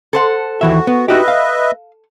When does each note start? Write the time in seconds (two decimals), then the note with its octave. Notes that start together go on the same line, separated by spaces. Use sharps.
0.13 A4 C5 F#5
0.61 D#2 E3 F#4 E5
0.87 B3
1.08 D#4 F#4 G4 B4 D#5 E5
1.28 F5